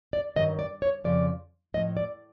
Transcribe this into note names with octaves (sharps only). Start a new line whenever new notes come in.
D5
G2 D#3 F#3 D#5
D5
C#5
F2 C#3 F3 D5
A2 F3 D#5
D5